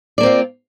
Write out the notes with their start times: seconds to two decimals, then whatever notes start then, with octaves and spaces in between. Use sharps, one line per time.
0.18 D5
0.21 A#3
0.23 C4
0.26 F4